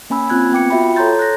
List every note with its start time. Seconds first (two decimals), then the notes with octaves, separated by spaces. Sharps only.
0.10 A#3 C#4 G#5 B5 E6
0.30 A#3 C4 F4 F#6 G#6
0.52 B3 G5 D6 C#7
0.70 F4 F#4 E5 G5 B5
0.96 A4 C#5 A#5 C6 G6 A6
1.19 F#6 A6 A#6